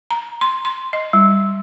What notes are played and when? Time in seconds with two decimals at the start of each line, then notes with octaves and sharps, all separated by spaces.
0.11 A#5
0.41 C6
0.65 C6
0.93 D#5
1.13 G3